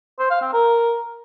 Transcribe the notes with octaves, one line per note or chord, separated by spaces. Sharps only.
C5
F5
C4
A#4